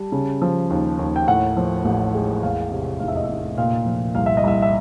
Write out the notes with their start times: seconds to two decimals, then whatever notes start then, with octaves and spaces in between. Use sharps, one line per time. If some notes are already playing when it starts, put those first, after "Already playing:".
Already playing: G3 A5
0.12 C#3
0.42 F3
0.70 D#2
0.99 D#2
1.16 G5
1.28 A2 F#5
1.57 F3
1.85 A1
2.14 G#3
2.43 E2 F5
2.72 C3
3.00 F1 F5
3.08 E5
3.16 D#5
3.24 F1 E5
3.58 A#2 F5
3.86 F3
4.15 C2 F5
4.26 E5
4.37 D#5
4.44 C2 E5
4.62 E5